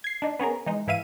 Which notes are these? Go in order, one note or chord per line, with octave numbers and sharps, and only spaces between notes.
G#6 C7
D4 D#4
B3 C#4 G#4 A#4
E3 G#3 D#4
G#2 E3 E4 E5 F5 D#7